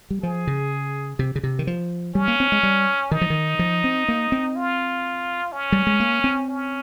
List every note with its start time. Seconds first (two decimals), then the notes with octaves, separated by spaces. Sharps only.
0.10 G3
0.22 F3 G#4
0.47 C#3
1.19 C3
1.36 C#3
1.43 C3
1.59 D#3
1.67 F3
2.15 G3 C#4
2.28 A#3
2.40 C4
2.52 G#3
2.63 G3
3.11 D#3 D#4
3.21 F3
3.30 D#3
3.59 F3
3.84 C4
4.08 A#3
4.32 C4
4.56 F4
5.52 C#4
5.72 G3
5.87 G#3
6.00 A#3
6.24 C4
6.49 C#4